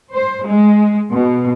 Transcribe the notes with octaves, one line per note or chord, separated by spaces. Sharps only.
C5
G#3
B2